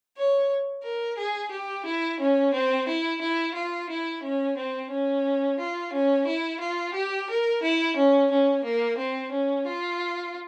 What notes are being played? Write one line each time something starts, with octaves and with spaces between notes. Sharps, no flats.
C#5
A#4
G#4
G4
E4
C#4
C4
E4
E4
F4
E4
C#4
C4
C#4
F4
C#4
E4
F4
G4
A#4
E4
C#4
C#4
A#3
C4
C#4
F4